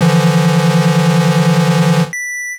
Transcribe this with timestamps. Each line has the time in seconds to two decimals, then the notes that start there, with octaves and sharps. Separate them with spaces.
0.01 D3 E3 F3
2.13 B6